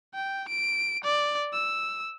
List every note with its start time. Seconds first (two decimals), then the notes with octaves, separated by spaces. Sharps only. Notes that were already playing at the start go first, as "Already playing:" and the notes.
0.14 G5
0.49 D7
1.05 D5
1.53 E6